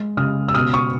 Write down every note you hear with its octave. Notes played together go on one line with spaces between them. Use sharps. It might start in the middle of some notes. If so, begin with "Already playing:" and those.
Already playing: G#3
C#3 D#6 F6
E6
B2 D#6 F6
C#6 D#6